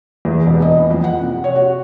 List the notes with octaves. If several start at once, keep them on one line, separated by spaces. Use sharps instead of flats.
E2
E1
D#5
E3
F2
F#5
C3
C#5
F#4